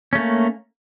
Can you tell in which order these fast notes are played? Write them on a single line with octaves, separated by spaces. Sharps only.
C#4 A3 A#3